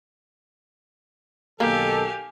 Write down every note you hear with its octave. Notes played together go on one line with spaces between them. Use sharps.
B1 D#3 A#3 G4 A4 F5 G#5